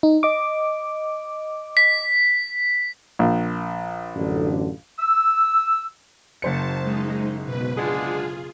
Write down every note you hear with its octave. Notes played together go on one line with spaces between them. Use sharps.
D#4
D#5 D6
B6
A#1
A1 F#2 D3
E6
F#1 C5 A5 C#7
G#3 D#4
B2 B4
D3 G#3 F4 G#4